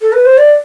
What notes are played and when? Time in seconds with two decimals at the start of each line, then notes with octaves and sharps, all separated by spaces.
0.00 A4
0.13 B4
0.25 C5
0.38 D5